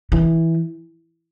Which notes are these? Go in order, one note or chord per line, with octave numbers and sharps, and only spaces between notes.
E3